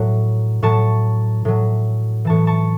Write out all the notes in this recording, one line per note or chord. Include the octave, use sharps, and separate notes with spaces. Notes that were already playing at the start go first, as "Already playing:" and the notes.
Already playing: A2 F#3
A2 F#3 A5 C#6
A2 F#3
A2 E3 A5 C#6
A5 C#6